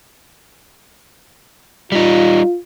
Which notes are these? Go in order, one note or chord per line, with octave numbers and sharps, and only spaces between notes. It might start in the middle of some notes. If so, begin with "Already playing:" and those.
G3 D#4 F4